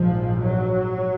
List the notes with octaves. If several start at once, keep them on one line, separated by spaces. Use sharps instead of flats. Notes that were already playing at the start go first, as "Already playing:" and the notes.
Already playing: A#1 G#2 F3
F#3